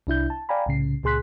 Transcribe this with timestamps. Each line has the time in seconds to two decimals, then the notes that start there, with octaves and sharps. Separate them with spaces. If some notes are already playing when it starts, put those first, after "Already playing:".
0.07 C2 D4 E4 G6
0.30 A5
0.49 D5 F5 G5 G#5 A#5 B5
0.66 C2 A2 C#3 C7
1.03 C#2 A#2 G#4 C6 F#6 B6